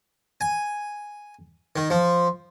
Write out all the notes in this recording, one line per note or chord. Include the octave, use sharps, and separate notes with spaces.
G#5
D#3
F3